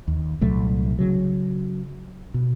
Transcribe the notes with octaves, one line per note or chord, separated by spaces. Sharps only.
D#2
C2 A#2 F#3 A3
C#3 F#3
B2